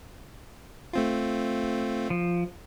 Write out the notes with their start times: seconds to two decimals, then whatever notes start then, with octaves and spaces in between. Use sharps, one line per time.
0.93 A3 C4 F4
2.10 F3